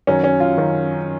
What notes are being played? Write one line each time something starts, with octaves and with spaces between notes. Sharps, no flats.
F#2 D#3 F#3 C#4
C#4
F4
F#2 D#3 F#3